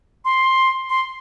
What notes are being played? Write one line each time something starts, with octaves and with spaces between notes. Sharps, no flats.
C6
C6